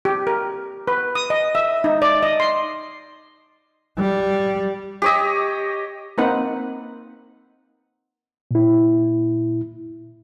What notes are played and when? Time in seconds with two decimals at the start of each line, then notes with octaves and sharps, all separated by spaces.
0.05 G4
0.27 A#4
0.88 B4
1.15 D#6
1.30 D#5
1.55 E5
1.84 D#4
2.02 D5
2.23 D#5
2.40 C6
3.98 G3
5.02 G4 C#5 D#5
6.18 A#3 C4 D#4 B4 F#5
8.51 A#2 E4